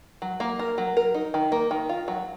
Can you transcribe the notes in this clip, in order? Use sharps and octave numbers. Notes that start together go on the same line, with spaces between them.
F#3
A#3
A#4
F#3
A#4
D#4
D#3
A#3
D#3
F4
F#3